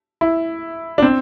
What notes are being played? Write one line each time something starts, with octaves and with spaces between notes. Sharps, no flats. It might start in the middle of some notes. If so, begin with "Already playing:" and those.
E4
D4
C4